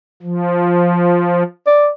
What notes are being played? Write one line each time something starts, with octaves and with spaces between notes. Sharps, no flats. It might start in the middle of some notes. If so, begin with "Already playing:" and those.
F3
D5